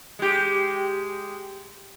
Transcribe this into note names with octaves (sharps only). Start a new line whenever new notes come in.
G#3 G4